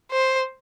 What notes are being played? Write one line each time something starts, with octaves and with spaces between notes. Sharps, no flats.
C5